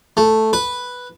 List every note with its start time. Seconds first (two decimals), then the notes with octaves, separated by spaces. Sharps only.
0.17 A3
0.53 B4